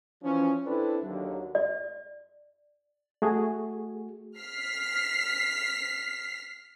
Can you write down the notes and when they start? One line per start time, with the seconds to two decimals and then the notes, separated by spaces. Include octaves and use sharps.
0.23 E3 F3 C#4
0.65 C4 D4 E4 A4 B4
1.03 D#2 D3 F#3
1.55 D5
3.22 A3 F#4 G#4
4.38 F6 B6 C7